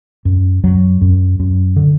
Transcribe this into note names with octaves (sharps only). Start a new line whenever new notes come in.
F#2
F#2 F#3
F#2
F#2
D3